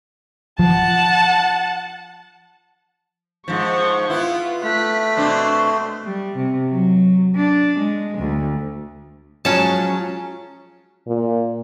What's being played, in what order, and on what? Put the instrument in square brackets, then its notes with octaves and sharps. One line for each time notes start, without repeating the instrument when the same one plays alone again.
[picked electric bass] F3 [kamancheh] F#5 A5
[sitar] G#2 F3 [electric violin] F#5 C#6
[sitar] B3 E4 [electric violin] F4
[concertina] A3 [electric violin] F#6 B6
[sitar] B2 C4 D4 [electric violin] C6
[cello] G3
C3
F#3
D4
G#3
D2
[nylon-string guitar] F3 F#3 G#3 [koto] C#4 A5
[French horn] A#2